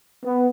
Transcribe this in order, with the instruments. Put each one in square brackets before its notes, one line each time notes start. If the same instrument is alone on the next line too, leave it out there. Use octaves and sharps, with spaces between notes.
[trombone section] B3